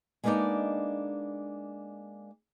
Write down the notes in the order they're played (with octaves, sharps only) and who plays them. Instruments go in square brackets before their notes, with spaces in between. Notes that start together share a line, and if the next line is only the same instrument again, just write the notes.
[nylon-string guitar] G#3 A#3 B3 D4 D#4 D5